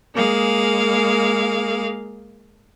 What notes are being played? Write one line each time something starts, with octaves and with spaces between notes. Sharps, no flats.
G#3 A#3 G#4 F5